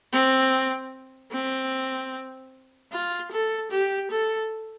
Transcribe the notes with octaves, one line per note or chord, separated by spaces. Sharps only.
C4
C4
F4
A4
G4
A4